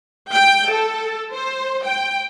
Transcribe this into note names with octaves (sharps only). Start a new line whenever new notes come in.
G5
A4
C5
G5